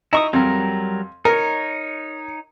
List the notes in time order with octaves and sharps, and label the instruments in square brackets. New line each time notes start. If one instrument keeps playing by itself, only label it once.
[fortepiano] D#4 A#5 [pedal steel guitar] E4 C#6 D#6
[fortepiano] F2 [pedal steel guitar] F#3 G3 A#4
[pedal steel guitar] D#4 C#5 [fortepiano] A#4